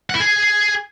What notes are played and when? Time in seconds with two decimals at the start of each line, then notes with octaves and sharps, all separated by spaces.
0.10 F#5
0.15 E4
0.20 G#4